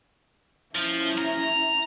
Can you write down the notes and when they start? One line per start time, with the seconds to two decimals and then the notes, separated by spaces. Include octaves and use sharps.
0.75 F3 C#4 E4
1.18 A#5